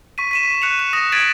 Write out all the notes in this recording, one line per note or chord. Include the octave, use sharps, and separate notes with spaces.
C#6 B6 D#7
B6 D#7 E7
F#6 C#7 F7
D#7
D#6 A#6 E7
G#6 A6 B6 D7 D#7 F#7